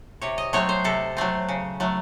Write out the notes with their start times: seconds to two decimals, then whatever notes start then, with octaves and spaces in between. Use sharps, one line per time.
0.22 C3 C#5
0.38 D#5
0.53 F#3 A3 C4 C#5
0.69 C5
0.84 C3 A4
1.17 F#3 A3 C4
1.49 C#3
1.80 F#3 A3